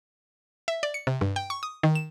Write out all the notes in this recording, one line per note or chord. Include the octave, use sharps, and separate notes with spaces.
E5
D5
C#7
C3
G2
G5
C#6
D#6
D#3
E7